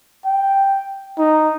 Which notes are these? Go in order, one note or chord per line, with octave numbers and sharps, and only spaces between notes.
G5
D#4